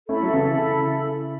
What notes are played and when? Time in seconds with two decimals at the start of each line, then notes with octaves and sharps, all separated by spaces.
0.09 A3 C#4 E4 A4 E5 B5
0.23 F#3
0.33 C#3 E3
0.57 C#3